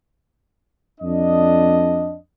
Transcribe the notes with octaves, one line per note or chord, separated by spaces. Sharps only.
F2 D4 D#5